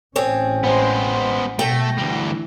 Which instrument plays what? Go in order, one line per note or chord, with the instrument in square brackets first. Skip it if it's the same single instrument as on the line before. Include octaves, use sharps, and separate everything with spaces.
[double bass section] A1 C#4 [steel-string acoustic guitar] C4 G#4 C#5
[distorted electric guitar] G#3 B3 [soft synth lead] C5
[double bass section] B2 [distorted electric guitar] A3 [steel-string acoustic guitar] G5 [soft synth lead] A#6
[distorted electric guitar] D2 G3 [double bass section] E3